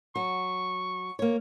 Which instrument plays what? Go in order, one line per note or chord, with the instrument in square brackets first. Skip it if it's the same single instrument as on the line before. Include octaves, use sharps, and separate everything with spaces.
[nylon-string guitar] F#3 [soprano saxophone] C#6
[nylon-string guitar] A#3 C#5